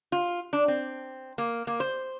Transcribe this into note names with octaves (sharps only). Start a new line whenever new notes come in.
F4
D4
C4
A#3
A#3
C5